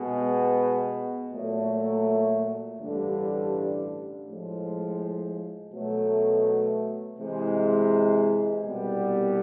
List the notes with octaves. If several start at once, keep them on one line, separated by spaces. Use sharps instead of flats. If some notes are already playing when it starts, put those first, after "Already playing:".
Already playing: B2 G#3 B3
A#2 F#3 A3
A1 G2 D3 G3
A2 F3 G#3
B2 F#3 A3
C3 E3 G#3
C2 B2 G3 B3